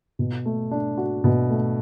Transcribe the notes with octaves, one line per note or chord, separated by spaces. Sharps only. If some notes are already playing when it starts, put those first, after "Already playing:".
B2
A3
D4
F#4
B2
A3